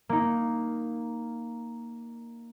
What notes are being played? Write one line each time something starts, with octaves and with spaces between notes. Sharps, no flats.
A#3 D#4